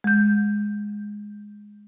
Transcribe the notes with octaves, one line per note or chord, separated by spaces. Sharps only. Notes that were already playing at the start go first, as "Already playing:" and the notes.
G#3 G6